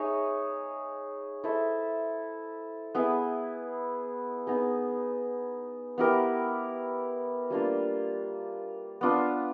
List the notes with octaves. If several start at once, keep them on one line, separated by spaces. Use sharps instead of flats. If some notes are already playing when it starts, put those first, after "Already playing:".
Already playing: D#4 G#4 C#5 E5
E4 A4 C5 E5
B3 E4 G#4
B3 D#4 G#4
B3 E4 G4 A#4
G3 A#3 D4 F4
B3 D4 F4